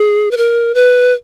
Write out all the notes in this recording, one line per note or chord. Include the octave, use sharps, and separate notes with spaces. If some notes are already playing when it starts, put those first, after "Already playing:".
Already playing: G#4
B4
A#4
B4